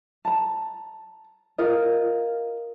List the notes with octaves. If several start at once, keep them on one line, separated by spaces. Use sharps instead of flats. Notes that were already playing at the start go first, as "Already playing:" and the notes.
A5 A#5
F4 A#4 D#5